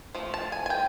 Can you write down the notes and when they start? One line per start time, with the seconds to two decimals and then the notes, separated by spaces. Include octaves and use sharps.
0.15 F3 A3
0.34 A5
0.52 G#5
0.66 G#5
0.70 G5